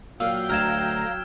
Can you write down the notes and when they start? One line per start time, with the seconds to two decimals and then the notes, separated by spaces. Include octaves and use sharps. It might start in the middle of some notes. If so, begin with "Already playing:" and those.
0.20 A#2 F#3 F5 G5 E6
0.50 D2 F5 A#5 F6 G#6 E7